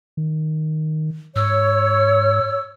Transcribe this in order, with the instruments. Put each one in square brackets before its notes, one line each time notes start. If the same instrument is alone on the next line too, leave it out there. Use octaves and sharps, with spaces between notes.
[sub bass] D#3
[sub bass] G#2 [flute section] C#5 [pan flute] E6